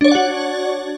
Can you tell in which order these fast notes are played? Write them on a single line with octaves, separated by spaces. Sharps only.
D4 C#5 D5 F#5 F#4